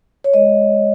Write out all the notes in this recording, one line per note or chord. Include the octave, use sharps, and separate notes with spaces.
C#5
G#3 D#5